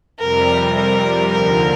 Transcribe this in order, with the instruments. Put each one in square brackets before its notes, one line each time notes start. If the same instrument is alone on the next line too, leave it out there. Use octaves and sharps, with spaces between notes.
[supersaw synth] F2 C3 G3 [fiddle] A#4
[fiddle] A#4
[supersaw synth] D#2 D3 F3 [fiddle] A#4